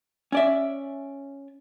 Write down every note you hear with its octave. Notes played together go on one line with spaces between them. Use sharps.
C#4 D5 E5